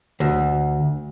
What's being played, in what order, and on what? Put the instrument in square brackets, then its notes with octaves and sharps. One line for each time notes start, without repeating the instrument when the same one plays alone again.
[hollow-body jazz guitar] D2